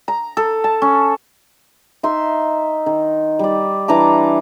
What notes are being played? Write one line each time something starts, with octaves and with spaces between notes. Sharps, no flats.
A#5
A4
A5
C#4
D#4 E5 C6
D#3
G3 D5
E3 D4 A#5 D6